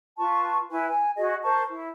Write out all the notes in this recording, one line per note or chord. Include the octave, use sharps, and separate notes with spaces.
F4 B4 A5 C#6
E4 B4 G#5
G#5
F#4 G#4 D#5
A#4 C5 A5 C#6
E4